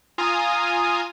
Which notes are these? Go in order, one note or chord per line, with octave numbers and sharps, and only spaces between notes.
F4 F5 G#5 A#5 D#6